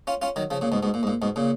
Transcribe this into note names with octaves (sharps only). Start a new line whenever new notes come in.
C#4 F4
C#4 F4
D#3 F#3
C#3 F3
A#2 C#3
G#2 B2
G#2 B2
A#2
G#2
A#2
G#2 B2
A#2 C#3